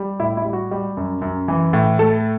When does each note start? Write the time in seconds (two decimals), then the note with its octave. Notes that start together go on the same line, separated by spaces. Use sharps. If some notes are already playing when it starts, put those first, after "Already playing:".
Already playing: G3
0.20 A2 E4
0.37 E4
0.45 G3
0.53 F#4
0.71 G3
0.97 F#2
1.22 F#2
1.48 E3
1.73 A2
1.99 A3 A4